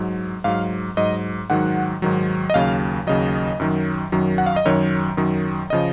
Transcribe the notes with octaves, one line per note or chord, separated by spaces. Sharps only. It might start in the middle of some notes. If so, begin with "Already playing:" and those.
Already playing: G#2 F#3
G#2 F#3 F5
G#2 F#3 D#5
G#2 D#3 F#3 F#5
G#2 D#3 F#3
D#5
D#2 C#3 F#3 F5
D#2 C#3 F#3 D#5
F#2 D#3 F#3
F#2 D#3 F#3
F#5
F5
D#5
F#2 D#3 F#3 C#5
F#2 D#3 F#3
C#3 F3 D#5